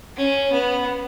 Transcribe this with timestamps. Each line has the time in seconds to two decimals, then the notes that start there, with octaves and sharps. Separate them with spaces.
0.16 C#4
0.52 B3